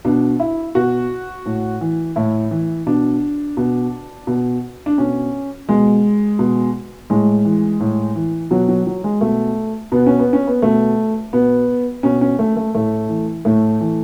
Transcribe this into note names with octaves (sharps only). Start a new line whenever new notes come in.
B2 D4
E4
B2 F#4
A2
E3
A2 E4
E3
B2 D4
B2
B2
D4
B2 C#4
B2 G#3
B2
A2 G#3
E3
A2
E3
B2 F#3
F#3
F#3
G#3
B2 A3
B2 B3
C#4
B3
C#4
B3
B2 A3
B2 B3
B2 C#4
C#4
A3
A3
A2 A3
E3
A2 A3
E3